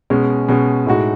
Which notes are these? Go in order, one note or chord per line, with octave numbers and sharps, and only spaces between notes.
B2 G#3 C#4
B2 G#3 C#4
A2 G#3 D#4 F#4